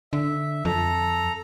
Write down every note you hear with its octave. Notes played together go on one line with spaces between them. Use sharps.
D3 E5
F2 A4 A#5